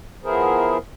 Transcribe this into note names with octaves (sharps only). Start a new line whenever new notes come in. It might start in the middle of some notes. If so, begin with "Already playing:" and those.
F3 B3 E4 G#4 A#4 C5